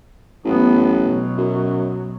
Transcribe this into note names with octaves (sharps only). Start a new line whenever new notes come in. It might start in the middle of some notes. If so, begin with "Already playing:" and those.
A1 F#2 B3
B2 F#3
F#2